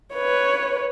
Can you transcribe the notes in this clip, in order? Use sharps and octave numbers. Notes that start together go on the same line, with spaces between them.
B4 C#5